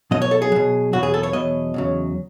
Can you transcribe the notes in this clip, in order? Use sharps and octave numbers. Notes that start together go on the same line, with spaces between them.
B2 F#3 D#5
C#5
A4
G#4
B2 F#3
E2 B2 F#3 F#4
G#4
A4
C#5
E2 B2 F#3 D#5
E2 C#3 F#3